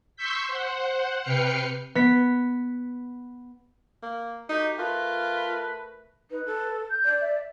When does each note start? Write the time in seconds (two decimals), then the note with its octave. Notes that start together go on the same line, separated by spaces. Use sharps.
0.16 C6 C#6 E6 G6 B6
0.48 C5 F#5
1.21 C3 B4 G5 F6 C7 C#7
1.95 B3 B6
4.03 A#3
4.49 A3 D#4 F#4 G4
4.79 A3 F4 A#4 B4
6.31 D#4 B4
6.46 A4
6.90 G6
7.05 D5
7.21 E5